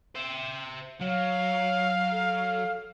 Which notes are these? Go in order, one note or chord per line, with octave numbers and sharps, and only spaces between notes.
C5 E5
F#3 C#5 F5
A4